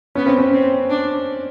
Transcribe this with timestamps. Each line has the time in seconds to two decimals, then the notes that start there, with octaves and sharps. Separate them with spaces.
0.15 B3 C#4
0.27 C4
0.38 C#4
0.53 C4
0.90 D4